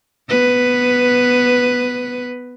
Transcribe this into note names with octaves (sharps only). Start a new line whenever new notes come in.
B3 B4